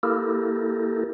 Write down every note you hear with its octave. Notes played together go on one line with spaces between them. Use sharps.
A#3 E4 G4 A4 A#4